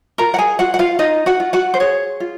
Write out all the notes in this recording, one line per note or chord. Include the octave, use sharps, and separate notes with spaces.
F4 A#4 A#5
F#5
G#4 G#5
F4 F#4 F#5
F#5
F4 F5
D#4 F4 D#5
F#4 F#5
F4
F#4 F#5
C5
G#4 C#5
F4